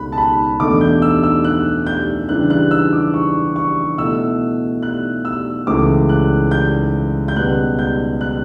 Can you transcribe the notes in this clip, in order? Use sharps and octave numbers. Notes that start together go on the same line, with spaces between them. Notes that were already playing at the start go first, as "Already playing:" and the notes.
Already playing: C#2 B2 A3 B5 F#6
A5
B5
E2 B2 A3 D4 D6
G6
E6
E6
F#6
G6
C#3 E3 G3 D4 F#6
F#6
E6
D6
C#6
C#6
B2 A3 E4 E6
F#6
E6
C#2 C#3 E3 A3 D6
F#6
G6
G6
C#2 B2 G3 B3 F#6
G6
F#6